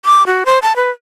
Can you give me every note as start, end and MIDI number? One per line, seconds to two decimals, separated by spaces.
0.05 0.23 86
0.27 0.44 66
0.46 0.59 72
0.62 0.75 81
0.76 0.90 71